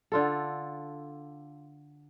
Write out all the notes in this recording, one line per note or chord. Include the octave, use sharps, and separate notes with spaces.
D3 F4 A4